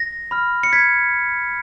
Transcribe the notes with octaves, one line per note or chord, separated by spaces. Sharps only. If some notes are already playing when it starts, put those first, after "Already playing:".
Already playing: A#6
B5 F6
C#7
G#6 B6